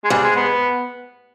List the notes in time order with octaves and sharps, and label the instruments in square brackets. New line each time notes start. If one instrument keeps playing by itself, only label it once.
[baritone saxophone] G#3
[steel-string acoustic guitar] G#2 [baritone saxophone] G3
[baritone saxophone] G#3
B3